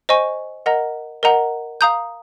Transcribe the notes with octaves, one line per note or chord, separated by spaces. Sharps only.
C5 D#5 G#5 C#6
A#4 D#5 F#5 A#5
A#4 D#5 F#5 A#5
F5 A#5 D#6 G6